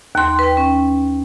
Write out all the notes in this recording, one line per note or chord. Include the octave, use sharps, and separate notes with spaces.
D#2 C6
B4 G5
C#4